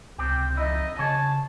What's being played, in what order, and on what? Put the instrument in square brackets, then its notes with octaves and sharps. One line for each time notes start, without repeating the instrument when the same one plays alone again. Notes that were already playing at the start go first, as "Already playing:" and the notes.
[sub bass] C#2 [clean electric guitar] C3 C4 G4
[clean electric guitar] F2 D#4 E4 [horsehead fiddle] D#5
[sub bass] C#3 [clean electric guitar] G#4 C#5 [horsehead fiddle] A5